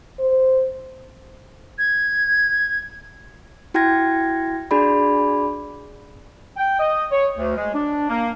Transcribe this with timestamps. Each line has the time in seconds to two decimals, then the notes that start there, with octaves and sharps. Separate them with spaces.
0.20 C5
1.78 G#6
3.74 E4 F#4 G5 F6 G#6 A#6
4.71 D4 F#4 G#4 D5 B5
6.57 G5
6.79 D#5
7.11 C#5
7.36 D2
7.56 G#3
7.74 D4
8.09 A#3